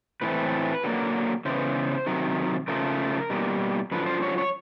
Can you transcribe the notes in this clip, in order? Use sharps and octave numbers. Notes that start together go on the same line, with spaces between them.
A2 E3 A3 C4 B4
D3 F#3 A#3
C#3 E3 G#3 B3 C5
C3 D#3 F#3
C#3 F3 A3 A#4
B2 G3 A#3
F#2 D3 F3 B4
C5
C#5
C#5